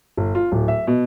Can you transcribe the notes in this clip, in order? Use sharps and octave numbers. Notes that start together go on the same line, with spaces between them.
G1
F4
D1
E5
B2